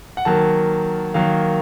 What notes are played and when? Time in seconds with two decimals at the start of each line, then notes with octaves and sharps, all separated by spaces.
0.17 F#5
0.25 D#3 F#3 A#3 A5
1.14 D#3 F#3 A#3 F5